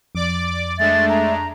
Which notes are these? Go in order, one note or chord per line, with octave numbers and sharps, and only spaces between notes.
F2 D5 D6
G#3 A3 D4 E5 A6
A#5